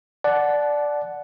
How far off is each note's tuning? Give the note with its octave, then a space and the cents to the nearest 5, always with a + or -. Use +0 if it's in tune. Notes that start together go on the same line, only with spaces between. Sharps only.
D5 +0 F#5 +0 A5 -25